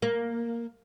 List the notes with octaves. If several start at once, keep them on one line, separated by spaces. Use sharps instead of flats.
A#3